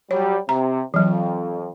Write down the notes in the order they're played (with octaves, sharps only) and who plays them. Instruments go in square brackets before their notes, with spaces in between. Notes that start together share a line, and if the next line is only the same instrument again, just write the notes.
[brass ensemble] F#3 G3 [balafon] C#5
[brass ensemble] C3 [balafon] A#5
[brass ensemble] F2 [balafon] E3 F#3